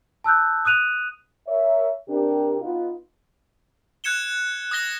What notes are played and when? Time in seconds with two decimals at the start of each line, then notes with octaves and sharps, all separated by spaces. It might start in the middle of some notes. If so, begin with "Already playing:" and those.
0.24 A5 E6 F#6 G6
0.65 D#6 F#6 D#7 F7
1.47 A#4 C#5 E5
2.09 C3 D4 G4 A#4
2.61 B3 D#4 F4
4.04 F#6 G#6 C#7 E7 G7
4.71 D#6 G#6 A#6 G7